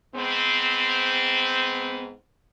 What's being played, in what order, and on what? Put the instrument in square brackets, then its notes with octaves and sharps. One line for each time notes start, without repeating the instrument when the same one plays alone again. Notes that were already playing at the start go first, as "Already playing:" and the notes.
[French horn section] G#2 B3 C4